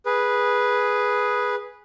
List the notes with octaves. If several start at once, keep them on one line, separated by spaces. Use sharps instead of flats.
G#4 B4